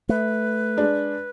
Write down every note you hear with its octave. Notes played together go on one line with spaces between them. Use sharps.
A3 B4
G#3 D4